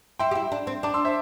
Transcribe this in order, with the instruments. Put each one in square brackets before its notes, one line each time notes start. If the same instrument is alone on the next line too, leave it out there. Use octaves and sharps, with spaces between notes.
[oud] E4 [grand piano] G5 C6
[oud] G4
E4
D4
C4
[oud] D4 [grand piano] A5 D6
[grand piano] C6 E6
C5 E5